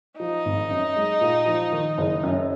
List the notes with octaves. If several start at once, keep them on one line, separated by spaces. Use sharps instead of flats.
F3 D#4
G#1
F#2
G#3
A#2
F3
D#3
F#1
F#2